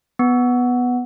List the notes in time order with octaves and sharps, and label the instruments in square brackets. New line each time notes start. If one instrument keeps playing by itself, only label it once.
[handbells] B3